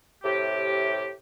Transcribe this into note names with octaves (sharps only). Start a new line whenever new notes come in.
A2 C3 G4